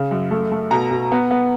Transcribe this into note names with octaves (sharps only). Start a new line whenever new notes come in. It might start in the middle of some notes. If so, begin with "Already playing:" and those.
Already playing: C#3
F#2
A3
A3
B2 A#5
B2
B3
B3